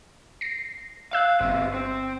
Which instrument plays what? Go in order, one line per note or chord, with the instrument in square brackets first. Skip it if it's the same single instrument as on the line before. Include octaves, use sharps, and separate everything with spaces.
[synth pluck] A#6 C7
[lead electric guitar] F5 [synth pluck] E6 F#6
[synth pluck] G1 [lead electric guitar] B2 C4
[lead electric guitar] C4